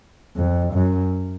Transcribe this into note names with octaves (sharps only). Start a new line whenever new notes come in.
F2
F#2